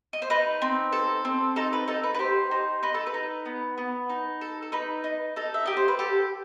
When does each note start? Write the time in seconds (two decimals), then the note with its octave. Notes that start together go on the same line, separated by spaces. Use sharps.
0.13 D#5
0.22 C5
0.30 D#4 B4
0.62 C4
0.93 A4
1.25 C4
1.56 D#4 A4
1.73 B4
1.88 D#4 A4
2.04 B4
2.14 B4
2.19 G4 C5
2.51 D#4 C5
2.83 D#4 B4
2.94 A4
3.07 B4
3.14 D#4
3.46 B3
3.78 B3
4.10 D#4
4.41 A4
4.62 A4
4.72 D#4 B4
5.04 D#4
5.36 D#4 A4
5.54 E5
5.66 G4 D#5
5.77 C5
5.88 B4
5.99 G4 A4